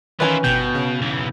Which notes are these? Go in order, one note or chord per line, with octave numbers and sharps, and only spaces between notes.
D#3 E3 C#4 E4 F4 B4 G#5
G1 B2 G5 G6
C#3
B1 E3